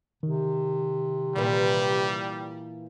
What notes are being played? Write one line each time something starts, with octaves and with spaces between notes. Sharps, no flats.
C3 D#3
A#2 E3 G3 B4